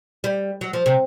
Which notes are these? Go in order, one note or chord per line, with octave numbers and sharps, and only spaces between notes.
G3
F#3
F3
C3